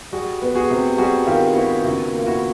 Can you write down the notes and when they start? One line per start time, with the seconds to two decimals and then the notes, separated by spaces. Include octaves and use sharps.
0.12 G3 F#4 G#4
0.42 B3
0.55 F#4 G#4
0.70 C3
0.98 G3 F#4 G#4
1.26 D#3 F4 G4
1.55 B3 E4 F#4
1.84 C#3 E4 F#4
2.13 A#3
2.19 F4
2.27 E4 F#4